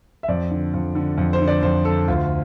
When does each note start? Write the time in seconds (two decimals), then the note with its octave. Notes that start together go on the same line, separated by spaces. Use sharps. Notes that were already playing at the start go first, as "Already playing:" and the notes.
0.23 E5
0.28 F2 D5
0.51 D3
0.74 F2
0.95 D3
1.18 F2
1.33 C5
1.40 D3
1.48 D5
1.63 F2 C5
1.85 D3 A4
2.08 D2 F4